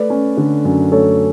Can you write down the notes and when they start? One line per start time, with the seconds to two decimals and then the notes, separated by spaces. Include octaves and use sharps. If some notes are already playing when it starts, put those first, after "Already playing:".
Already playing: A3 B4 D5
0.10 C#4
0.37 D3
0.65 F#2
0.92 A3 A4 C#5